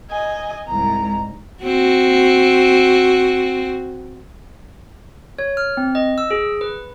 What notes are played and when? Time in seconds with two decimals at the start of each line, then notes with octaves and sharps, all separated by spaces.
0.10 D#5 G#5
0.67 C2 G#2 A#5
1.63 C4 F#4
5.39 C#5
5.57 F6
5.77 C4
5.95 D#5
6.18 E6
6.31 G#4
6.61 B4